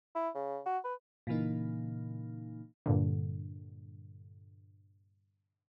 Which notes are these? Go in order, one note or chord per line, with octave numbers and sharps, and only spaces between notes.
E4
C#3
F#4
B4
A#2 C#3 E3 A#3 D#4
G2 A#2 D3